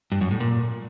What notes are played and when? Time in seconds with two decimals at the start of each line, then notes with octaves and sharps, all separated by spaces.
0.12 G2
0.21 F#2
0.31 A2
0.40 A#2